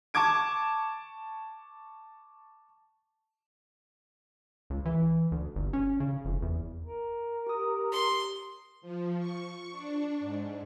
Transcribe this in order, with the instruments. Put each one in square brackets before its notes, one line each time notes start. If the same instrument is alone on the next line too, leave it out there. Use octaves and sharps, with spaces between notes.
[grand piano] A5 C#6 D6 G#6 D7
[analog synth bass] C#2
E3
D2
G1
C#4
C#3
F1
E2
[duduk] A#4
[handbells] G4 D#6
[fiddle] C6
[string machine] F3
C#6
D4
G#2